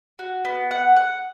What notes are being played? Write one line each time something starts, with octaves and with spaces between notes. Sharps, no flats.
F#4
B3
F#5
F#5